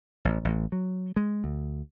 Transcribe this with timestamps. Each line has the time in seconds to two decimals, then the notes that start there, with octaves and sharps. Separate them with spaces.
0.25 A1
0.45 A1
0.72 F#3
1.16 G#3
1.44 D2